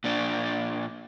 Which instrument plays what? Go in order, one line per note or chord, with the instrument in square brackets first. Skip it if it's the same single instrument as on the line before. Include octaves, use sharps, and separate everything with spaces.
[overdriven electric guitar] A#2 D4